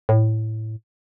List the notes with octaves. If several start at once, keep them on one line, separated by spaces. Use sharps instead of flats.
A2